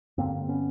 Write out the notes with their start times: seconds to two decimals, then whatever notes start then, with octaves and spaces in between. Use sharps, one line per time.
0.18 G2 D3 A#3 C4
0.48 B3 C#4